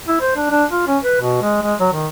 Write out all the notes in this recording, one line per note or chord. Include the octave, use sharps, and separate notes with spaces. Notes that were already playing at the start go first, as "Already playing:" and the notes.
E4
C5
D4
D4
F4
C#4
B4
B2
G#3
G#3
F#3
D#3